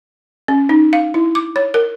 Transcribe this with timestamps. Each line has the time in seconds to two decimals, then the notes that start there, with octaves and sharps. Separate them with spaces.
0.48 C#4
0.69 D#4
0.93 F5
1.14 E4
1.35 D6
1.56 C#5
1.74 A#4